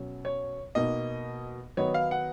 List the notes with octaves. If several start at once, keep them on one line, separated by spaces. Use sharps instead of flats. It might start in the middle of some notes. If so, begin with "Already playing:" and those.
Already playing: B2 F#3 C#4
C#5
B2 A#3 D#4 D#5
D#3 F#3 B3 D#4 C#5
F5
F#5